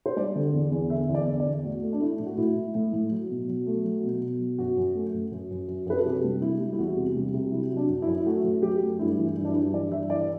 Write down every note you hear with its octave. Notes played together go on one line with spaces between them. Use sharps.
C5
G3 D5
D3
E2
E2
D3 E5
E2
D5
D3
D5
E2
A2 F#4
A3
D4
A3 E4
A2
F#4
A2 E4
A2
A2
A2
F#3
B2
F#3
A3
F#3
B2
B2
F#3
F#2 F#4
F#2
A3
F#2
F#2
F#2
F#2
F#2 B4
A4
C3 G4
G3
G3 E4
G3
E4
E2 F#4
C3
G3
C3
F#3 E4
F#3
D4
F#2
E4
F#2
E4
A3 F#4
F#2
F#3 G4
A3
G2 E4
E3
E4
G2
D4
E4
G2
E3 D5
G2 E5
E3 D5
D5